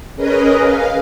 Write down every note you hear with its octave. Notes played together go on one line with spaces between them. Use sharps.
C#4 G#4 A#4 B4 D#5
F5